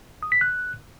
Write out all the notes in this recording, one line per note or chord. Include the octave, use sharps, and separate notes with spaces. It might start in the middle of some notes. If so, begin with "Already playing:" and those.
D#6
B6
F#6